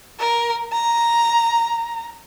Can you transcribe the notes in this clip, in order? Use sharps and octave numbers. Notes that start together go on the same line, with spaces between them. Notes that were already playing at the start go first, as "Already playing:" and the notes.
A#4
A#5